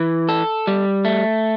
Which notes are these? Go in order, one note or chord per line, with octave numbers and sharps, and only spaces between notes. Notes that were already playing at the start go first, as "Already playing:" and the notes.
Already playing: E3
A4
G3
A3